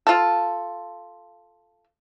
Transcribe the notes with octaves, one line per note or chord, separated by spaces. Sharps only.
F4 A4